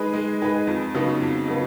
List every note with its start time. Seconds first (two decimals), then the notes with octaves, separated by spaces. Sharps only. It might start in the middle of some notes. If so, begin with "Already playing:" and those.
Already playing: G#3 D#4 G#4 B4
0.13 G#3
0.41 D#4 G#4 B4
0.67 F2
0.94 C#3 F#3 B3 D#4
1.22 F2
1.48 C#3 F#3 B3